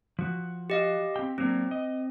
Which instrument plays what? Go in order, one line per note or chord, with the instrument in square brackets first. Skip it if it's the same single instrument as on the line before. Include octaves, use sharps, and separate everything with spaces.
[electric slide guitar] F3 F#4
[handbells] G4 D#5 F5
[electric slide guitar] C4 G4 G5
[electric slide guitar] F#3 A#3 D4 [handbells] C4
[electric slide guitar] D#5